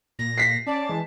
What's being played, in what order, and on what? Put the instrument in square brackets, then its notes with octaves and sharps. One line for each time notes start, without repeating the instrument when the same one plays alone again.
[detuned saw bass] A#2 [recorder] A#6
[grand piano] B6 C7
[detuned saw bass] C#4 [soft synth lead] D5 [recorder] A5
[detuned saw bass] E3 [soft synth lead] G#3